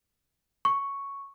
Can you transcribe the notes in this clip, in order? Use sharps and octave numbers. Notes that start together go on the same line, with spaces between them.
C#6